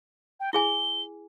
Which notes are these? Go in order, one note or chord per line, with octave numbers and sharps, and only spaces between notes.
G5
E4 G#4 G#5 G7